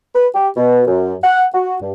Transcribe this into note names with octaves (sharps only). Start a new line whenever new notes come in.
B4
G4
B2
F#2
F#5
F#4
G2